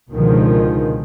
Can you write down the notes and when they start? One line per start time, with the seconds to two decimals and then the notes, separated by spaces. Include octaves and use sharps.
0.11 C#2 B2 D3 D#3 F3 G#3